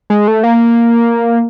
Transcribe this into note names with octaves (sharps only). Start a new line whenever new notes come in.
G#3
A3
A#3